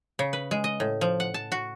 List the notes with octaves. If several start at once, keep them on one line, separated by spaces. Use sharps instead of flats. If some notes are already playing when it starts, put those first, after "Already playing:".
C#3
B4
G#3
D#5
A2
F3
F#5
A5
F#4